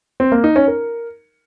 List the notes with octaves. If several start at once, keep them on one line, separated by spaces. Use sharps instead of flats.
C4
A#3
D#4
C#4
A#4